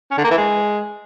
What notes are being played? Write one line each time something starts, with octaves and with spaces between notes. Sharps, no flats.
C#4
D3
A#3
E3
G#3